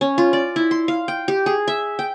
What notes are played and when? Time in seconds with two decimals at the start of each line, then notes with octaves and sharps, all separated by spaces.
0.01 C#4
0.18 F4
0.33 D5
0.56 E4
0.71 C6
0.88 F5
1.08 G5
1.28 G4
1.46 G#4
1.68 E5
1.99 G5